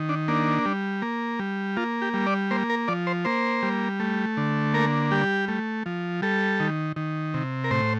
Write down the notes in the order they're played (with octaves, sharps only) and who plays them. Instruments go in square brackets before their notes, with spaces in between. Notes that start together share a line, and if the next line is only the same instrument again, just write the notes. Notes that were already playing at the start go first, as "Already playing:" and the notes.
Already playing: [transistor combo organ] D#3
D4
A#3 D4
G3
A#3
G3
A#3 F4
G4
G3
D5
A#3 C5
A#4
F3 D5
C5
A#3 C5
G3
A3
D3
A#3 A#4
G3 G4
A3
F3
G3 A4
D#3
D#3
C3
A#4
A2 C5